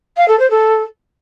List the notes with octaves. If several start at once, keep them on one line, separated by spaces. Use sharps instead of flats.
F5
A4
C5
A4